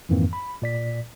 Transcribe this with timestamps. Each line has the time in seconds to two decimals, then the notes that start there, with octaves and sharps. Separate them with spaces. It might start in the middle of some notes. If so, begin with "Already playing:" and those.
0.09 F2 G#2 D#3 E3 A#3 C4
0.33 B5
0.62 A#2 D5 B6